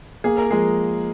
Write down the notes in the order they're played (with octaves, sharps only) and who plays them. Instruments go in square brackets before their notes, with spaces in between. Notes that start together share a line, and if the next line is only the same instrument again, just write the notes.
[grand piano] A#3 [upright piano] G#4
[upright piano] A#4
[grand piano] F3 [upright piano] G#3 G#4